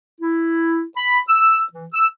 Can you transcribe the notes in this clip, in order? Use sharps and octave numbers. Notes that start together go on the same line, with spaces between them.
E4
B5
E6
E3
E6